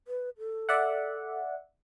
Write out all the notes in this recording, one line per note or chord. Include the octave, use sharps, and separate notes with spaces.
B4
A4
D5 E5 F#5